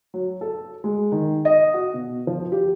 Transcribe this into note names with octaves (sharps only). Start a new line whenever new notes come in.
F#3
A4
G#3
D#3
D#5
F#4
B2
F3
G4